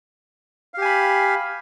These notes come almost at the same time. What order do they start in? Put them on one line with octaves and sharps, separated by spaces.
F5 G4 G#5 B5